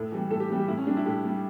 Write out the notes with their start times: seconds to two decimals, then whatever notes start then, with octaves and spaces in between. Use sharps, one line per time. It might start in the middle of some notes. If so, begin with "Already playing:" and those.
Already playing: A2 A4
0.12 E3 G3
0.30 A2 A4
0.40 G4
0.49 E3 G3
0.60 G4
0.68 A2 E4
0.77 C#4
0.87 G3 D4
0.97 E4
1.06 A2 G4
1.24 G3